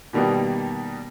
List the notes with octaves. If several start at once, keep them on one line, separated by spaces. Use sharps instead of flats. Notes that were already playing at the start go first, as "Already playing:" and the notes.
B2 D#3 G3 A#3 B3 D#4